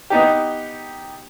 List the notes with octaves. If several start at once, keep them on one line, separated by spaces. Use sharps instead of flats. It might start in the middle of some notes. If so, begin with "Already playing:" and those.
B3 D#4 G4